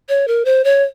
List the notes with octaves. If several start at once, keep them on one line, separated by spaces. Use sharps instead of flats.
C#5
A#4
C5
C#5